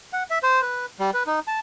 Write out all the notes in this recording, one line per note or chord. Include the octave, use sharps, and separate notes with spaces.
F#5
E5
C5
B4
G3
B4
D#4
A5